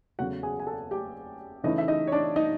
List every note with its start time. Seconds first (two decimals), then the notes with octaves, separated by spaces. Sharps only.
0.19 E2 C#3 F#3 A3 F#4 F#5
0.43 G#4 G#5
0.59 G#5
0.67 A4 A5
0.91 G4 G5
1.63 C#3 E3 A3 C#4 D#4 E4 D#5
1.78 E5
1.88 D#4 D#5
2.07 C#5
2.12 D4 D5
2.36 D#4 D#5